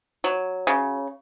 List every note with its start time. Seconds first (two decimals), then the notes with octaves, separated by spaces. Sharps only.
0.24 F#3
0.67 C#3